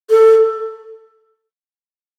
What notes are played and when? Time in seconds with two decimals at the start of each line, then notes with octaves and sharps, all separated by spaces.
0.10 A4